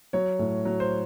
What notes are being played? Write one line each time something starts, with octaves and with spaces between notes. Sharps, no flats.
F#3 C#5
A2
F#3
C5